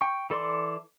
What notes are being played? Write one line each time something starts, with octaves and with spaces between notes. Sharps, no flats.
G5 C#6
E3 A4 D5 C6 D6